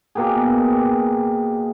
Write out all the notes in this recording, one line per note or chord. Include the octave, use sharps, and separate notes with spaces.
B2 A#3 G4 G#4